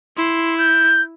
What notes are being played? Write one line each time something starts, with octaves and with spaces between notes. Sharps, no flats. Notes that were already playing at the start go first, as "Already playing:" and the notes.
E4 C6
G6